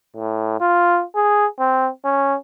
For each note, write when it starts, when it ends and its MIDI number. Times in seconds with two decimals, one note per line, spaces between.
0.17 0.58 45
0.61 1.03 65
1.16 1.46 68
1.59 1.89 60
2.05 2.35 61